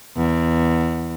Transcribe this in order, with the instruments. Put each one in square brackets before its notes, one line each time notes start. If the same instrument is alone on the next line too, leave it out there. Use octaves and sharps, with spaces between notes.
[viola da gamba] E2